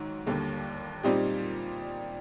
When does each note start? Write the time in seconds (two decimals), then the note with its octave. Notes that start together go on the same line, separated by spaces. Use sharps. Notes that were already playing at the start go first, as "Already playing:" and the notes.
Already playing: G#2 D#3 F#3
0.27 D#2 D3 G3 A#3
1.03 A#2 G3 C4 D#4 G4